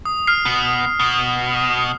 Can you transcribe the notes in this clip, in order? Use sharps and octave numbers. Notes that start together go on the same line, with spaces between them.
D#6
F6 C7
B2
B2